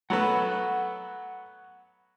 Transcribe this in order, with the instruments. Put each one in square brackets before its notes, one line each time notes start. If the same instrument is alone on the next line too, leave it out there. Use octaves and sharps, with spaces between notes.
[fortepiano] F#3 A3 B3 [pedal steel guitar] F#5 B5 E6